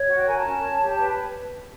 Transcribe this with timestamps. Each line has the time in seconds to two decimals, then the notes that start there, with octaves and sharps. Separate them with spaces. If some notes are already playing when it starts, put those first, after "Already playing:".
Already playing: C#5
0.09 F#4 F#5
0.18 G5
0.27 A#4 G#5
0.36 A5
0.44 C#4
0.62 C#5
0.80 G4
0.98 B4